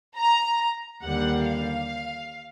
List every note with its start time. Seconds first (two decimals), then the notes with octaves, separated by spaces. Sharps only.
0.18 A#5
1.03 D#2 D3 G3 A#3 F#5
1.46 F5